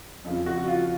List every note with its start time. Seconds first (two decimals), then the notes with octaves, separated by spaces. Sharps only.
0.24 F2 C#3 F3
0.46 F#4
0.68 F4